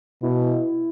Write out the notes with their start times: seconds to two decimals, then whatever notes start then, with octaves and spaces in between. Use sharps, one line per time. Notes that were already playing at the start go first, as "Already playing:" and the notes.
0.22 B2 E4